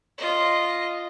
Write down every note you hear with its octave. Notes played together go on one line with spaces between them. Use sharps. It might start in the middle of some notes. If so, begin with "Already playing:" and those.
F4 D#5